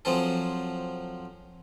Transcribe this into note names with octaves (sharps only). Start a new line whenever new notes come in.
F3 F#3 C4 G#4 A4